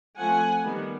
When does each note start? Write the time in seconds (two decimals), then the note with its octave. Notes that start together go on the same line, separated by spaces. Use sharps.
0.17 F3 A3 C4 F#5 G#5
0.63 D#3 G3 B3